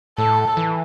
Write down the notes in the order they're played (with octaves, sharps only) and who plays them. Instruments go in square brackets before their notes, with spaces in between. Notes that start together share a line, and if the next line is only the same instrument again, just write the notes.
[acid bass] A2 [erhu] A4
[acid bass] E3